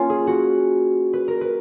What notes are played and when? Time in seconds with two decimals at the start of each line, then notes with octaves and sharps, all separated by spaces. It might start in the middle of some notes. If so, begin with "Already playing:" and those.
Already playing: A#3 C#4 F4
0.10 G#4
0.27 F#4
1.13 B4
1.28 A#4
1.41 B4